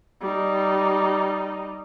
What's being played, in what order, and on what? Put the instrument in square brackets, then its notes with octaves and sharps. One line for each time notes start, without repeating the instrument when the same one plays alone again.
[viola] G3 D#4